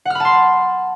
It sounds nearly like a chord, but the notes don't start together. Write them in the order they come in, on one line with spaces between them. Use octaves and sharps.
F#5 F6 B5 A5 C6